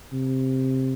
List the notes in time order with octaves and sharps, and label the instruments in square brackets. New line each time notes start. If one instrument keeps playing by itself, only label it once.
[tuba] C3